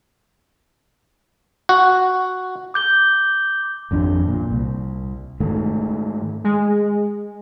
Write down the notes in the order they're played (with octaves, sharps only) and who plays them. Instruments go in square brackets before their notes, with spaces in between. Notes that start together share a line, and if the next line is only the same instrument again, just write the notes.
[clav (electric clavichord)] F#4
[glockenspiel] D6 G6 G7
[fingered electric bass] G#1 F2 D4
A#2
C2
G#2 D#3 A3
[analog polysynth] G#3